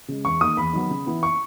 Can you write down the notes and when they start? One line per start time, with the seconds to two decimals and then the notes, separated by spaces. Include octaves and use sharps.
0.08 C#3 G#3
0.25 E2 C#6
0.41 D#3 A#3 D#6
0.57 E2 B5
0.73 D#3 F#3 B3
0.90 C#3
1.06 E3 B3 E4
1.23 C#6